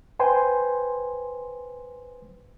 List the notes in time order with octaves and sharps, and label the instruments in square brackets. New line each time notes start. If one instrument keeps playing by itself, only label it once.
[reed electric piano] B4 C5 G5 G#5 C6